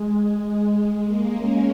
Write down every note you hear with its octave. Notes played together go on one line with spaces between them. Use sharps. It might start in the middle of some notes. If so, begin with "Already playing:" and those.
Already playing: G#3
G#3
A#3
C#4